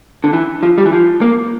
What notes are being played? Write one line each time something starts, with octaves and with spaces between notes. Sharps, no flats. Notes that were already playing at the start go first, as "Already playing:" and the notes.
D3
E3
F3
G3
E3
F3
A#3